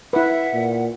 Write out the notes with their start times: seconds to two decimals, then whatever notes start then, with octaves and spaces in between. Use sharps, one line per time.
0.13 E4 B4 E5 F#5
0.53 A#2